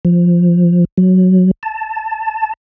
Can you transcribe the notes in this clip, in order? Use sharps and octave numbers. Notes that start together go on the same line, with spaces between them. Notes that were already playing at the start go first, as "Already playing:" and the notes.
F3
F#3
A5